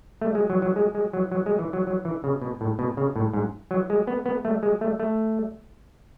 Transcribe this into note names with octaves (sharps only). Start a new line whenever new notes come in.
A3
G#3
F#3
F#3
G#3
G#3
F#3
F#3
G#3
E3
F#3
F#3
E3
C#3
B2
A2
B2
C#3
A2
G#2
F#3
G#3
B3
B3
A3
G#3
A3
A3